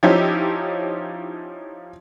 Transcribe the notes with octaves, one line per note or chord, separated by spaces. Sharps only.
F3 C#4 D#4 E4 G4